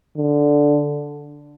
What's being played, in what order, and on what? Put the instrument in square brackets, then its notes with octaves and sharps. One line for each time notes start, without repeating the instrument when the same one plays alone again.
[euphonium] D3